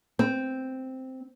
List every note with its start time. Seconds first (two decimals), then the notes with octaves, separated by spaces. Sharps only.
0.19 C4